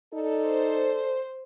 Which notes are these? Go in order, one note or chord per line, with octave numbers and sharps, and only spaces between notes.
D#4 A4 D5
C5